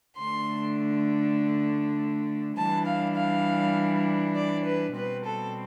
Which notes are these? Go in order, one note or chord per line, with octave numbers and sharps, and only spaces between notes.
D3 A3 D4 C6
E3 G3 D4 A5
F5
F5
D5
B4
B2 G3 C4 B4
A4